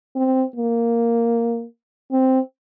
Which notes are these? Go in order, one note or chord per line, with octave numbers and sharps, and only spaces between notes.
C4
A#3
C4